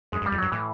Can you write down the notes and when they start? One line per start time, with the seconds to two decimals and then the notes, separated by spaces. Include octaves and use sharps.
0.12 F#2 G#3
0.22 G2
0.26 G3
0.32 F2
0.38 G2 F#3
0.52 A2 E3